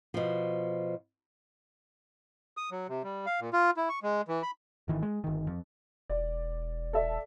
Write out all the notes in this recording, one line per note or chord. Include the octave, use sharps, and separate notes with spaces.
B2 F3
D#6
F#3
C3
G3
F5
A#2
F4
E4
C#6
G#3
E3
B5
G#1 D#3 E3
G#3
G1 D#3
F2
E1 D5
A4 D5 E5